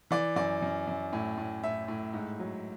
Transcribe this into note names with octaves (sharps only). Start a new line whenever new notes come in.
E3 D5
F#2 D5
F#2
F#2
A2
A2
A2 E5
A2
G#2
F#3